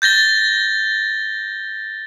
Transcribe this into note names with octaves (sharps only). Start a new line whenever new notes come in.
G6 A6 A#6 G7